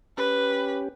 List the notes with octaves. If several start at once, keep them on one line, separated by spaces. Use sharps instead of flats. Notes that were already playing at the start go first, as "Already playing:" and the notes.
C#4 G4 B4